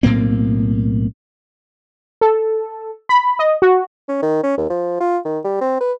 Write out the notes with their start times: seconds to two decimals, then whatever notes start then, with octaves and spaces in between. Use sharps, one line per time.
0.03 B1 A2 A#3 C4
2.21 A4
3.09 B5
3.39 D#5
3.62 F#4
4.09 C#4
4.22 D#3
4.43 C#4
4.57 D#2
4.70 F3
5.00 F4
5.25 D#3
5.44 G3
5.61 C4
5.80 B4